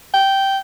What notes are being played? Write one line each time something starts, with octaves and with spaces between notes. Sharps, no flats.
G5